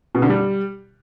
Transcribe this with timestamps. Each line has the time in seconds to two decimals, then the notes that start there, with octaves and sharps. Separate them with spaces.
0.15 B2
0.22 D3
0.30 G3